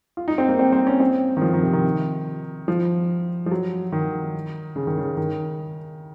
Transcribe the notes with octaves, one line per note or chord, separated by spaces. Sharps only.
F4
D#4
C4
A#3
C4
C4
C#4
C4
D#3
F3
D#3
C3
D#3
F3
F3
F#3
D#3
C#3
D#3
C#3
D#3